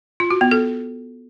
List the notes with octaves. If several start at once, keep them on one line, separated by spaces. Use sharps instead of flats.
F4
F#4
B3
A4